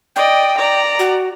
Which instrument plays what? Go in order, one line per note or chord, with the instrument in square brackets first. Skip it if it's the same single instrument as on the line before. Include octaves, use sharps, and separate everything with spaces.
[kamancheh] D5 D#5 [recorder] G5
[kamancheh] D5 A#5
[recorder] F#4